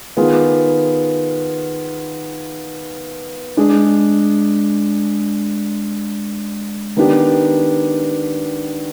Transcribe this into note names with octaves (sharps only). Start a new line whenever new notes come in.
D#3 B3 F4 G#4
G#3 D4 G#4
D#3 B3 D4 G4